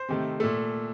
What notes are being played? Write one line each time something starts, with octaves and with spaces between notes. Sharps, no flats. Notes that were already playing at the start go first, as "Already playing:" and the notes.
Already playing: C5
C3 D#3 A3
A#2 A3 A4